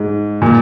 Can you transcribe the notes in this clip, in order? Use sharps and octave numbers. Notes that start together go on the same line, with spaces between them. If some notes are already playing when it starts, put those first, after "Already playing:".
Already playing: G#2
A#2